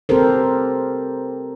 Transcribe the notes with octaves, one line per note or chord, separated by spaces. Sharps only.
C4 G4 A4 A#4 C5